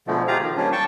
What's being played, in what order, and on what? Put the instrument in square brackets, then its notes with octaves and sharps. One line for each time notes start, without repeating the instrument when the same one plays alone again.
[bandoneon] B2 D3 F3 G#3 A3
F4 G4 G#4 F5 A#5
D#3 F3
G3 A#3 C#4 D4
G5 A5 C#6